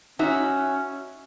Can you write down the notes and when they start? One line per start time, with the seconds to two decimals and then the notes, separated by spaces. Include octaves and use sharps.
0.19 C#4 D#4 F#4 E5